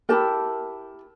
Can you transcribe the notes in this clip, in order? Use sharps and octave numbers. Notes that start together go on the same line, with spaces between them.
E4 G4 A#4 A5